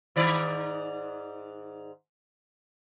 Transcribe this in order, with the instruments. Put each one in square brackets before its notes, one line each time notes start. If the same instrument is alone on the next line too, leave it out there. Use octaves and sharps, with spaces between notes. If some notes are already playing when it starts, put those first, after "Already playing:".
[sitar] G#2 D#3 D5